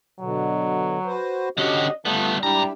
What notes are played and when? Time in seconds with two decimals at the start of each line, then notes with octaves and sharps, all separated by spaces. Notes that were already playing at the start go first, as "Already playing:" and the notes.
0.21 B2 D3 F#3
1.05 F#4 B4 C5
1.58 D3 C#4 F#4 G4 D#5
2.05 G3 A3 B3 F4
2.43 G#2 G3 D4 E4 G4 A#5